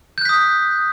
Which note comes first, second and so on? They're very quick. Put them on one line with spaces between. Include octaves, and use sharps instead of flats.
G6 F#6 B6 D#6